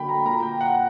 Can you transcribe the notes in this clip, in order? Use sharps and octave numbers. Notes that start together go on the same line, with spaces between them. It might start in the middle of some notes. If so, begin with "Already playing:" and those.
Already playing: D3 F#3 A#3 G5 B5
A#5
A#2 A#3 A#5
G5
F#5